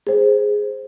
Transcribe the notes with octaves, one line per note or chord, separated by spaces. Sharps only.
G#4 C5